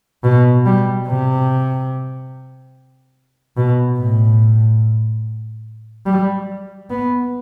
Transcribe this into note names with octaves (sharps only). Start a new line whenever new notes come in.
B2
G3
C3
B2
A2
G3
B3